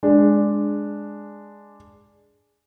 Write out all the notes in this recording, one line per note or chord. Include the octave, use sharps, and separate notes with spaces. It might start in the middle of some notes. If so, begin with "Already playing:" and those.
G#3 D4